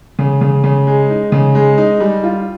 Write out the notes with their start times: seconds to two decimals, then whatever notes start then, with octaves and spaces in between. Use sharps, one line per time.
0.19 C#3
0.41 C#3
0.64 C#3
0.87 G#3
1.10 D#4
1.32 C#3
1.55 G#3
1.78 D#4
2.00 G3
2.23 F4